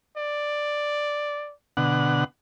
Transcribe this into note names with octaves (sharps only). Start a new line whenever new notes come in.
D5
B2 D3 F#5